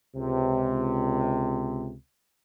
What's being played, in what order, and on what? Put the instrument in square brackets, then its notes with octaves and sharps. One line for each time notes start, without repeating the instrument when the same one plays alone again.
[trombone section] C#2 C3